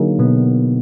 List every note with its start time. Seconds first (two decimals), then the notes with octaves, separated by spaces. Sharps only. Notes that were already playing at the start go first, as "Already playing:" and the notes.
Already playing: D3 F#3 A#3 D#4 G#4
0.19 B2 B3